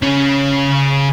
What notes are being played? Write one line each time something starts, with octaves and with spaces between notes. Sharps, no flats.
C#3 C#4